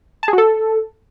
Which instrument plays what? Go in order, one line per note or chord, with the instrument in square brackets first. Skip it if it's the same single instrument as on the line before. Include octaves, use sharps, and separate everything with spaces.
[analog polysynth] A5
G#4
F#4
A4